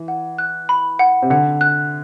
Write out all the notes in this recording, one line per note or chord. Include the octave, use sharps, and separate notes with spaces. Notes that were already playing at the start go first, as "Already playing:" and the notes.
Already playing: E3
F#5
F#6
B5
F#5
C3
D3 F#5
F#6